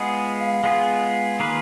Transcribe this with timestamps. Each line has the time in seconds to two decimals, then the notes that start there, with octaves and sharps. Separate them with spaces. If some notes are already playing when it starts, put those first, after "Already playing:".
Already playing: G#3 B3 F4 G#4 D#5 F#5
0.41 F5
0.52 F#5
0.63 G#3 B3 F4 G#4 F5 G#5
1.40 D#3 A#3 F4 G#4 B4